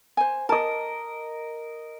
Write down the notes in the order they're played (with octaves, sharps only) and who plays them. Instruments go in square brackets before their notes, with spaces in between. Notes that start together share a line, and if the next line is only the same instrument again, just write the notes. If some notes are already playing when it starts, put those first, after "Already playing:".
[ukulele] C5 G#5
[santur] A#4 D#5 [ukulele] A5